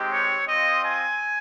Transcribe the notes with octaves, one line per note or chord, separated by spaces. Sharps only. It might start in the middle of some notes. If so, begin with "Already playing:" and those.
Already playing: G#3 C4 D#4 G4
C#5
C4 F4 D#5
G#5